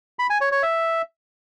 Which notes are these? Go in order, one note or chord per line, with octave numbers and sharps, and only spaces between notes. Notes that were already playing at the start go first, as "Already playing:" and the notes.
B5
G#5
C#5
C#5
E5